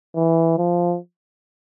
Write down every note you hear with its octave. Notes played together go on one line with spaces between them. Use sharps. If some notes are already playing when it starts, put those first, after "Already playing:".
E3
F3